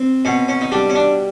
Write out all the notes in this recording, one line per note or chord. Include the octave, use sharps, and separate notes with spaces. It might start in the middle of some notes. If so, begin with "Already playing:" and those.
Already playing: C4
B2 C#4
C#4
D#4
G3 D4
C#4
D4